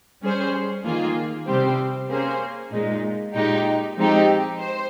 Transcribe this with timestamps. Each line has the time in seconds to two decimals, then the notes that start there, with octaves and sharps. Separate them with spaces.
0.22 G3 C#4 G#4 C5
0.84 D#3 A#3 F4 G#4
1.47 C3 G3 C4 G4 C5
2.09 A#3 C#4 G#4 C5
2.72 A#2 G#3 D#4
3.35 A#2 G#3 D#4 G4
3.96 F3 G#3 C4 D#4 G4
4.59 C5